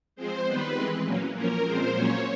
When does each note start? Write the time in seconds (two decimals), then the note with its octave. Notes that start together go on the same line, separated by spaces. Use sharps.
0.16 F3 G#3 C4 C5
0.46 D#3 G3 B3 B4
0.75 E3 G#3 C4
1.04 A#2 F#3 A#3 C#4
1.33 F3 A#3 C#4 A#4
1.63 A#2 F3 G#3 C4 C5
1.92 A#2 F#3 A#3 C#4 C#5